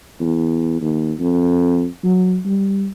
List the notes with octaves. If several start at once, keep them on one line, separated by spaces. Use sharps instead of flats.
E2
D#2
F2
F#3
G3